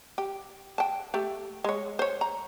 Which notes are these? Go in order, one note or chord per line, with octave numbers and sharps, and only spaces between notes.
G4
G5 A5
A3 G4
G#3 C#5
C5 C#5
A#5